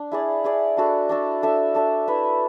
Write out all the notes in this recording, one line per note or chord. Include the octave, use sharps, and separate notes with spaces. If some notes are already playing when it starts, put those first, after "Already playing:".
Already playing: D4
E4 G#4 D5
E4 G#4 D5
D4 F#4 A4
D4 F#4 A4
D4 A4 E5
D4 A4 E5
E4 B4 E5